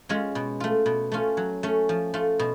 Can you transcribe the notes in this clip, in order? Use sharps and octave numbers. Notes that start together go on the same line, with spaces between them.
G#3 C#4 F4
B2
A3 F4
B2
A3 C#4 F4
F#3
A3 C#4
F3
A3 F4
B2